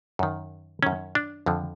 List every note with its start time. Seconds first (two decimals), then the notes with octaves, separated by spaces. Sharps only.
0.19 F#2 D#3
0.83 F#2 D#3 C#4
1.15 D4
1.46 F2 D3 F3